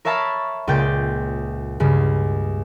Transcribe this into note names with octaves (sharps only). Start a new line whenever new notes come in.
A#4 C#5 E5 F5 A5 B5
C#2 A#2 C#3 G5 G6 A6
C#2 G2 C#3